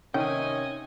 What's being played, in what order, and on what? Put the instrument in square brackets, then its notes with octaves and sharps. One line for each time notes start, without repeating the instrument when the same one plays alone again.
[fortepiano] C3 D#3 [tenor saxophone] C#4 [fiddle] D#5 G#5 [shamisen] G5